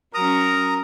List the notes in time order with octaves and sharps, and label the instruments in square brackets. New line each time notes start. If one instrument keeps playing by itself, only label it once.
[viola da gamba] F#3 C#4 [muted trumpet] A#4 [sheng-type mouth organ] A#5 [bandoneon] D#6